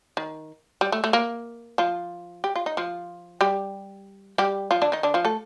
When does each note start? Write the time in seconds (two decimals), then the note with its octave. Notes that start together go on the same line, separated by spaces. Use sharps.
0.17 D#3
0.81 G3
0.92 A3
1.04 A3
1.13 A#3
1.78 F3 F4
2.44 G4
2.56 F4
2.66 D#4
2.77 F3 F4
3.41 G3 G4
4.38 G3 G4
4.71 F3 F4
4.82 D3 D4
4.92 D#3 D#4
5.03 D3 D4
5.14 F3 F4
5.25 A3 A4